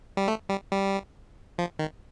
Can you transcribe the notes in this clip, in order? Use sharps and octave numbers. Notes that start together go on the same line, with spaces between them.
G3
A3
G3
G3
F3
D#3